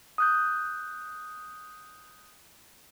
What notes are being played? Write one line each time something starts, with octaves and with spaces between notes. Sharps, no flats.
D#6 F#6 G6